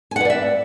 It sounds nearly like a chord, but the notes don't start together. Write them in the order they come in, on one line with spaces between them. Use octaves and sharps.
G#5 F#5 B4 D5 E5